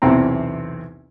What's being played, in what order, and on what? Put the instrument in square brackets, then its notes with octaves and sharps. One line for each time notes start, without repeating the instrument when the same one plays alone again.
[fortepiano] B1 E2 C3 E3 C4 A#5